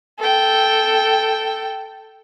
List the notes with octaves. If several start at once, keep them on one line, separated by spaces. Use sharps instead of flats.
A4 G5